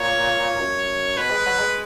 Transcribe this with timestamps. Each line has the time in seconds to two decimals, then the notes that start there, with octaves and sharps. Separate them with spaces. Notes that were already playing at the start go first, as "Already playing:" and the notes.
Already playing: A#2 C#5
0.60 F#2
1.17 B2 B4
1.31 G#3
1.46 F#3
1.59 G#3